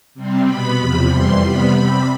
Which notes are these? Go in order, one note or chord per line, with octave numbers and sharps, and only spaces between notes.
C3 G3 C4
B2 B3 B5
E2 C3 F3 B5
F2 E3 G3 C6
C3 G3 B3 B5
C3 G3 C4 B5